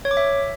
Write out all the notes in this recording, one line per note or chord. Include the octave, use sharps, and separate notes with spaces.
C#5
D6
E5